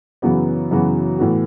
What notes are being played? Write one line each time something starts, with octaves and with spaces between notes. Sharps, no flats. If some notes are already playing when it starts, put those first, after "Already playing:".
F#2 C#3 E3 B3 F#4
F#2 C#3 E3 B3 F#4
A2 E3 B3 F#4